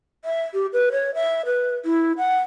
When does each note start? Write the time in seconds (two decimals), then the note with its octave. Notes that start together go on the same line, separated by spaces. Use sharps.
0.25 E5
0.54 G4
0.73 B4
0.92 C#5
1.14 E5
1.46 B4
1.85 E4
2.18 F#5